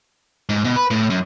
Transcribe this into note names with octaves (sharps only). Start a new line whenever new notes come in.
G#2
B2
B4
A2
F#2